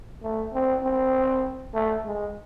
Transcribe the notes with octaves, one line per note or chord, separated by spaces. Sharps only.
A3
C4
C4
A3
G#3